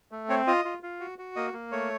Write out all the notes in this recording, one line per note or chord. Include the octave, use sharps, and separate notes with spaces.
A3
C4 C#5
F4 D#5
F4
F4
F#4
F#4
A#3 D#5
A#3
A3 C#5